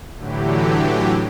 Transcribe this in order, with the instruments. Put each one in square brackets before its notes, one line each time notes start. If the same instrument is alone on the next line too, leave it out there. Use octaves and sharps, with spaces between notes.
[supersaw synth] A2 D3 E3 F#3 G4